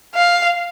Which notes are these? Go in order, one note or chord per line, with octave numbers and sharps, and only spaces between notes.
F5